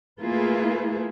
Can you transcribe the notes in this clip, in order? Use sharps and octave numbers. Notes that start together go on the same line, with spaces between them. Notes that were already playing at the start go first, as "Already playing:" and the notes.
A3 A#3 E4 F4 G#4 B4